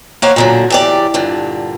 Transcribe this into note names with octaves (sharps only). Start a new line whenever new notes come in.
A#3 B3 C5 C#5 F5 F#5
A#2 D3 F#3
E2 G4 D5
G2 A#2 D3